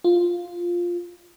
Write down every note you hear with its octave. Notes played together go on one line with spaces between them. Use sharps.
F4